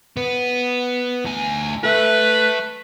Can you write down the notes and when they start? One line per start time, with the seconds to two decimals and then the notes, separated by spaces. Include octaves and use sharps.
0.17 B3
1.25 D2 G#5
1.84 A4 B4 E5